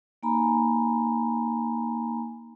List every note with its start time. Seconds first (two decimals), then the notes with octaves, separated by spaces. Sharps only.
0.23 A#3 D#4 G#5 A#5 B5